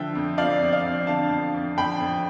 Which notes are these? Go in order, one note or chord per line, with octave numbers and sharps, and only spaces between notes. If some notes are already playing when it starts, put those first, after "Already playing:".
Already playing: D3 F3 E5 G5
F2
F3 D5 F5
F2
D5 F5
F2
D3 F5 A5
F2
F2
F2 G5 B5
F2